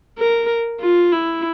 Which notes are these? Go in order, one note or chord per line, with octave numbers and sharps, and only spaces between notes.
A#4
F4
E4